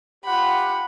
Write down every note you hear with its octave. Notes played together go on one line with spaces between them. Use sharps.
F4 G4 F#5 B5